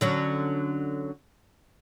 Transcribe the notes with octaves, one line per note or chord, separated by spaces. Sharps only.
D3 F#3 C#4